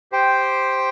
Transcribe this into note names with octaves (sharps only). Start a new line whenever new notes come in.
G4 C5 G5